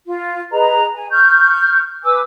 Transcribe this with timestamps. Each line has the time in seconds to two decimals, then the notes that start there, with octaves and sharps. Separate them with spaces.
0.04 F4
0.51 G#4 B4 D#5 A#5
0.94 G#5
1.12 C#6 F6 G6
2.03 B4 G#5 D6 E6